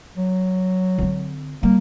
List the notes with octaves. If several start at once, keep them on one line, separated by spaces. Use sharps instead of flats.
F#3
D3 C4
G3 A#3